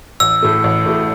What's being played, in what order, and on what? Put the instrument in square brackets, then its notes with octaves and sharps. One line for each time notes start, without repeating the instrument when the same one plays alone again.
[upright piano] A1 [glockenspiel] E6
[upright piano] A2 A3
A1
A2 A3